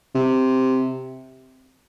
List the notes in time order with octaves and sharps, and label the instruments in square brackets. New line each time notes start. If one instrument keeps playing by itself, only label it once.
[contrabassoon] C3